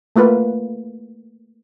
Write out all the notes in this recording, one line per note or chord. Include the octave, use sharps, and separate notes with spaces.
A3 A#3 F4 B4